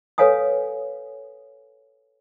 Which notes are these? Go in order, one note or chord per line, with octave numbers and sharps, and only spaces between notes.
A4 B4 C#5 F5 G#5 D#6